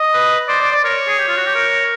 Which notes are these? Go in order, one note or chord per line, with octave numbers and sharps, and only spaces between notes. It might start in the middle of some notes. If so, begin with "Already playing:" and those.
Already playing: D#5
B4
C5 D5
D5
D5
A#4 C#5
G#4
G4
F4
F#4
G4
A#4